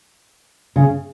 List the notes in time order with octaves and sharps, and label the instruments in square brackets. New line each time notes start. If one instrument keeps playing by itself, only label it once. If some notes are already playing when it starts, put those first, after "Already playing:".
[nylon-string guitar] C#3